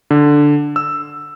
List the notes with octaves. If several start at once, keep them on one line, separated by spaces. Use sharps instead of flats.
D3
E6